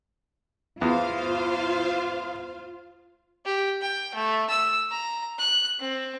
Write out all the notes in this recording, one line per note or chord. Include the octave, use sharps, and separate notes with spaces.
E2 F4 C5 F5
G4
G5
A3
E6
A#5
F#6
C4